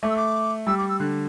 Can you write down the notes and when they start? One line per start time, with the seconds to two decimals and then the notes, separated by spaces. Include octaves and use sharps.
0.02 A3 D6
0.09 E6
0.16 D6
0.67 G3 E6
0.77 D6
0.89 E6
0.99 D3 F#6